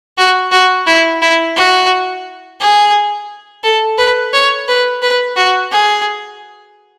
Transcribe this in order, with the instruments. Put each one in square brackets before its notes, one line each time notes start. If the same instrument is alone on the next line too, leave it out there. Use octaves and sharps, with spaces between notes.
[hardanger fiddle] F#4
F#4
E4
E4
F#4
G#4
A4
B4
C#5
B4
B4
F#4
G#4